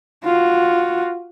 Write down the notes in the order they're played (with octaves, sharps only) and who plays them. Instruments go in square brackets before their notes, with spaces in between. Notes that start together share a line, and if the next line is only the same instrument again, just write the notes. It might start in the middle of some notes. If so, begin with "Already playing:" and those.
[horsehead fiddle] F4 F#4